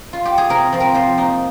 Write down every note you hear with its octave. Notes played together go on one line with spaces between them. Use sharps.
F4
G4
G#4
C3 A#4
F3 C4
A#4
F3 C5
A#3 D#4